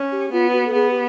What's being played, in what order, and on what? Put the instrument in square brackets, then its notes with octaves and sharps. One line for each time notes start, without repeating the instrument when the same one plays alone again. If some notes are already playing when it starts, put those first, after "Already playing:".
Already playing: [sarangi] C#4
[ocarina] G4
[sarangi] B3 [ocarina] F4
[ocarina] F#4
A4
[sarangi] B3 [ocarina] G#4
[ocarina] G4